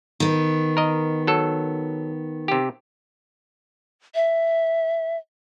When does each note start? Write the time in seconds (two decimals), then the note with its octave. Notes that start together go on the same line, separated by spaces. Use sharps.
0.20 D#3 B3
0.77 A#4 D#5
1.27 F#3 A4
2.48 C3 G4
4.15 E5